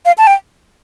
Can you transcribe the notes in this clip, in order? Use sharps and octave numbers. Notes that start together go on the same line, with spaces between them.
F5
A5
G5